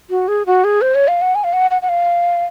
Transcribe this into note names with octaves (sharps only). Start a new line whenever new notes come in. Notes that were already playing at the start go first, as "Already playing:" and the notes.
F#4
G#4
F#4
G#4
C5
C#5
F5
F#5
G#5
F5
F#5
F#5
F#5
F5